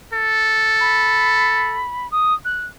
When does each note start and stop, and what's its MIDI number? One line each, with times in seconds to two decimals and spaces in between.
0.13 1.85 69
0.80 2.10 83
2.11 2.34 87
2.45 2.66 90